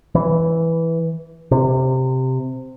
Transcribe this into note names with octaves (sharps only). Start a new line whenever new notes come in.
E3
C3